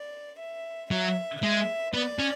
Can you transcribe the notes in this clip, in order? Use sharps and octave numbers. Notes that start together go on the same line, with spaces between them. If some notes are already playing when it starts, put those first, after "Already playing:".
Already playing: D5
E5
F#3 E5
G#3 E5
B3 D5
C#4